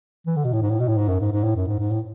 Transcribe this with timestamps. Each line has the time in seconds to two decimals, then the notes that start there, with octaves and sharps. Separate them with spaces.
0.27 E3
0.36 D3
0.45 B2
0.53 A2
0.62 G#2
0.70 A2
0.80 B2
0.88 A2
0.97 G#2
1.09 F#2
1.21 G#2
1.32 G#2
1.44 A2
1.56 F#2
1.68 G#2
1.80 G#2
1.91 A2